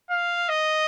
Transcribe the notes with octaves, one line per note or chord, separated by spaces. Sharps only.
F5
D#5